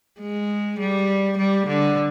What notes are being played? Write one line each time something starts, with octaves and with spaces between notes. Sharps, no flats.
G#3
G3
G3
D3